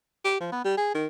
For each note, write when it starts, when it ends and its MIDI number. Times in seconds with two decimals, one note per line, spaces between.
0.25 0.40 67
0.41 0.48 53
0.52 0.63 59
0.64 0.77 55
0.77 0.92 68
0.95 1.07 51